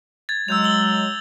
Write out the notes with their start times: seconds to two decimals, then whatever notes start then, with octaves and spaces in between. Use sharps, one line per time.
0.29 G#6 A6
0.48 F#3 G#3 E6 G6 F7
0.64 F#7 G7